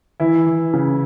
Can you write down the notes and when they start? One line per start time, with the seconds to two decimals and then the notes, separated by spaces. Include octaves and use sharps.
0.20 E3 E4
0.46 E3
0.73 C#3